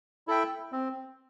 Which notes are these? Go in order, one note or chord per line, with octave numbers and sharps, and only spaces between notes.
E4 A4 E5 G5
C4